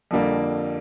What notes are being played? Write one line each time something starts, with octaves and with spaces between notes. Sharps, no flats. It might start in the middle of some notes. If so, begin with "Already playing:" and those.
F2 D3 G3 A#3